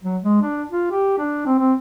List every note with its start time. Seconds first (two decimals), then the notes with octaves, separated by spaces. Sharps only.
0.03 F#3
0.23 G#3
0.41 D4
0.70 F4
0.91 G4
1.18 D4
1.46 C4
1.59 C4